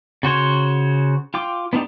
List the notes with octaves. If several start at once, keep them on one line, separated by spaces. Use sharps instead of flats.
C#3 F#4 C5 C#5
F4 G5 D6
B3 D4 D#4 F4 G4